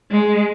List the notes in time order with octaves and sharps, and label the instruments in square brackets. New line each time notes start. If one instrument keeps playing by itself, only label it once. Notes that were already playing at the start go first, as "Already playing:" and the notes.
[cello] G#3